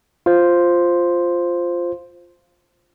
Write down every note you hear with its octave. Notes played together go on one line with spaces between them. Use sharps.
F4 C5